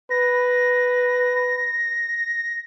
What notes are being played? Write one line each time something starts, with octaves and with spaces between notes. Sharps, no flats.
B4 A#6